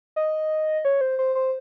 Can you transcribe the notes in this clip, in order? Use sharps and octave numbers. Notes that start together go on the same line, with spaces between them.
D#5
C#5
C5
C5
C5